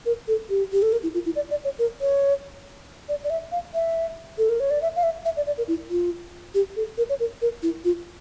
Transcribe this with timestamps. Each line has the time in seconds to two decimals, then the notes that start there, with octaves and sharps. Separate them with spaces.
0.06 A#4
0.28 A4
0.50 G4
0.73 G4
0.82 A4
0.92 A#4
1.03 E4
1.14 F4
1.26 E4
1.36 D5
1.50 D5
1.64 C#5
1.79 A#4
2.01 C#5
3.09 D5
3.24 D5
3.30 E5
3.52 F5
3.74 E5
4.38 A4
4.49 A#4
4.60 C#5
4.71 D5
4.82 E5
4.96 F5
5.03 E5
5.25 E5
5.37 D5
5.47 D5
5.58 A#4
5.68 E4
5.90 F4
6.54 G4
6.76 A4
6.98 A#4
7.09 C#5
7.20 A#4
7.42 A#4
7.63 E4
7.85 F4